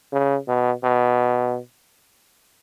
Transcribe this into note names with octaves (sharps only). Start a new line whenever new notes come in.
C#3
B2
B2